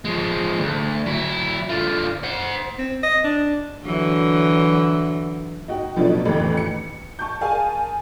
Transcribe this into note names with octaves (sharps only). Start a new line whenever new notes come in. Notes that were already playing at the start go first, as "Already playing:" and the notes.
F3 G#3
D2
F#3 E4
D3 F4
C5 F#5
C4
D#5
D4
D3 E3 F#3
D#4 F#4 G5
B2 F3 F#3 A3 D4 D#4
A1 F2 D#3 E3
C#7
A5 C#6 G6
G#4 A#4 F5 G#5 A5